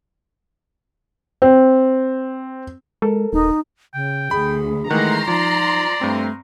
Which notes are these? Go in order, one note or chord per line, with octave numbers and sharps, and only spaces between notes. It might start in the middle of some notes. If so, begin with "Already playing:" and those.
C4
G#3 A4 A#4
D#1 D#4
C#3 G5
D2 G#4 B5
D#3 E3 G#3 A3 F#5 A#5 C6
F3 D#4 D5
G2 A3 C4